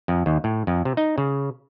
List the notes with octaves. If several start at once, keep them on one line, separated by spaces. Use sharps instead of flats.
F2
D#2
A2
F2
C3
D#4
C#3